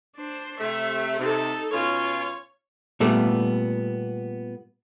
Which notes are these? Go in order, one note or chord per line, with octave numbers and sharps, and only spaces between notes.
D4 C5
C3 A3 E5
C3 D#4 A4
B2 C#4 F4 C#5
A#2 G3 A3 B3